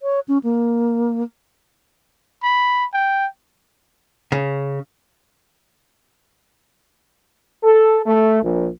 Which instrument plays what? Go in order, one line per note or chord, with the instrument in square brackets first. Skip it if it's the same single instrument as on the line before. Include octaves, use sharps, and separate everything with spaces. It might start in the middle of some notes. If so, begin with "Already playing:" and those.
[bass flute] C#5
C#4
A#3
[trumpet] B5
G5
[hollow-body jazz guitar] C#3
[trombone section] A4
A3
A#1